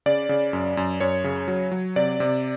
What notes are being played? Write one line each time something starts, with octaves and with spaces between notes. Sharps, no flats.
C#3 D5
C#3
F#2
F#2
F#2 C#5
C#3
F#3
F#3
C3 D5
C3